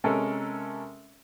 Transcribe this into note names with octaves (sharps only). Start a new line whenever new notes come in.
C3 G#3 C#4 A4 A#4